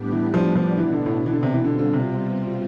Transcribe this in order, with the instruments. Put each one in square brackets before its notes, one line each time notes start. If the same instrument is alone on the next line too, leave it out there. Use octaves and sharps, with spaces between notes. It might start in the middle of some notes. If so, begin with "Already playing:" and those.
Already playing: [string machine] A2 G3 B3 D4 G4
[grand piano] E3
F3
F3
[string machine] B2 B3 D4 [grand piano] E3
[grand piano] D3
A2
E3
D3
C3
E3
[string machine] B2 G3 C4 F4 [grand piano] D3
[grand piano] D3
C3